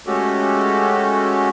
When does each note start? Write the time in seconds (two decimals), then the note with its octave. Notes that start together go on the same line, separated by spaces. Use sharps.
0.07 G#3 A3 C#4 F#4 G4 A4